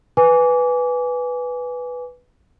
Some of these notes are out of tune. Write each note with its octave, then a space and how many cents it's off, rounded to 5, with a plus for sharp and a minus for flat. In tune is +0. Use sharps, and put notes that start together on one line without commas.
B4 +0 G#5 +0 D6 -30